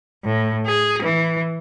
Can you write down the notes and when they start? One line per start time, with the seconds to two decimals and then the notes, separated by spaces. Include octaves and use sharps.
0.25 A2
0.66 G#4
1.03 E3